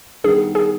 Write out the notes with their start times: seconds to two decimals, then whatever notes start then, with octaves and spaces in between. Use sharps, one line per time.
0.24 D#3 G3 B3 G#4
0.55 G#4